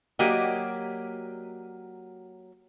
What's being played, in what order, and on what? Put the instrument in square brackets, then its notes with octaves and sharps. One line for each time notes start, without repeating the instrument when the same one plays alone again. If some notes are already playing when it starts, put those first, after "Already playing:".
[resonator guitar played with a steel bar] F#3 A#3 F#4 G4 D5 D#5